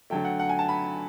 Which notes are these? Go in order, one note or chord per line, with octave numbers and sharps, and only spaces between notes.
D3 F#3 A3 G5
F#5
F#5
G#5
A5
B5